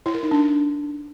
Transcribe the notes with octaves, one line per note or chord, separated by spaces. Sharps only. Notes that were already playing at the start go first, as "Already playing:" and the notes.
E4
A#4
D#4
D4